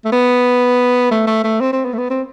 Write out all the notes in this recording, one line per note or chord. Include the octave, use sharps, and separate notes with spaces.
A3
B3
A3
A3
A3
C4
C4
B3
A3
B3
C4